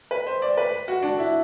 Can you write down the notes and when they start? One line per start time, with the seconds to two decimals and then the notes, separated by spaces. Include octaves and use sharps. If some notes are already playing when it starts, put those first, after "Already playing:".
0.11 B4
0.27 C5
0.42 D5
0.57 B4
0.88 F#4
1.02 D4
1.19 E4